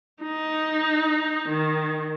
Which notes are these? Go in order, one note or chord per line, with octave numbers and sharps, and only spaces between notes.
D#4
D#3